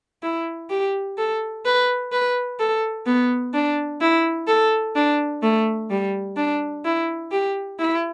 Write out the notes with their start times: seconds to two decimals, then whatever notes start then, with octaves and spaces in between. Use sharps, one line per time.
0.23 E4
0.70 G4
1.18 A4
1.65 B4
2.12 B4
2.59 A4
3.06 B3
3.54 D4
4.01 E4
4.47 A4
4.95 D4
5.43 A3
5.90 G3
6.37 D4
6.85 E4
7.32 G4
7.79 E4